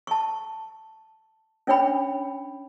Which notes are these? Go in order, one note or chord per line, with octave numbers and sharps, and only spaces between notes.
A5 C#6
C#4 D4 C#5 G5 B5